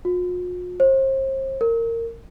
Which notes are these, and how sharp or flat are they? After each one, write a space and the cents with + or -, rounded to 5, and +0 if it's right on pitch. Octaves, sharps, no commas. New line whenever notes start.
F4 +45
C5 +35
A#4 -20